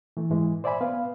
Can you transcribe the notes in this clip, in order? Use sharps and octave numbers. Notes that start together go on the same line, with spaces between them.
E3 A3
G#2 E3 G#3
C5 D5 E5 G#5 B5
B3 B4 F5